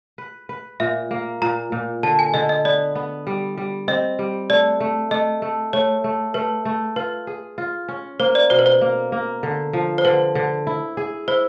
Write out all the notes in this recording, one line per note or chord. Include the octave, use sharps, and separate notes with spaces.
B4
B4
A#2 E5
A#3
A#2 A#5
A#2
D3 A5
G#5
D3 D#5
D#5
B3 D5
B3
G3
G3
C4 D#5
G3
A3 D5
A3
A3 D#5
A3
A3 C#5
A3
A3 B4
A3
F4 B4
G#4
F4
C#4
A#3 C5
D5
B2 C5
B4
C5
A#3
A#3
D3
F3
C5
D3 B4
D3
E4
G#4
E4 C5